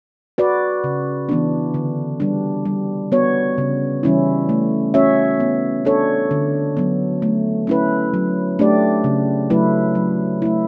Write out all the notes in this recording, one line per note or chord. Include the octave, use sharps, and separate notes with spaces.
F#4 B4 D5
C#3
E3 B3 D4
D3
G3 D4
G3
B3 F#4 C#5
C#3
E3 G3 C#4 E4
A3
C#4 F#4 C#5 E5
B3
D4 A4 C#5
D3
F#3 B3
A3
C#4 E4 B4
F#3
A3 D4 G4 D5
C#3
F#3 A3 E4 B4
F#3
A3 E4